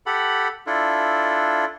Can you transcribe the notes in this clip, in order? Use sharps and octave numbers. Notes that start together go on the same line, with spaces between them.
G4 A4 F#5 B5
D4 E4 F4 A4